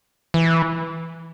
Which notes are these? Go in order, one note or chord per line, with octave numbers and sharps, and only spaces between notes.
E3